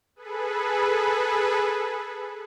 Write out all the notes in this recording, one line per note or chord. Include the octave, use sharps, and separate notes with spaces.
G#4 A4 B4